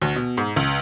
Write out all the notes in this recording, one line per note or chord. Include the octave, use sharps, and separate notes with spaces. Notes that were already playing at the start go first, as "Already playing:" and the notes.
D2
B2
G#2
C#2